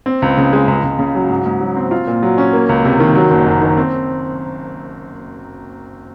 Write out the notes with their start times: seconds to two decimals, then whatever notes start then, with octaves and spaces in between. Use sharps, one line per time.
0.06 C4
0.22 C#2
0.38 C#3
0.53 G#3
0.68 C#2
0.83 C#2
0.99 C#3
1.15 F#3
1.30 G#2
1.46 G#2
1.61 F#3
1.76 C4
1.91 F4
2.07 A#2
2.23 F#3
2.38 C#4
2.53 A#3
2.69 C#2
2.84 C3
3.00 D#3
3.15 F#3
3.31 F#1
3.46 F#2
3.61 D#3
3.77 C4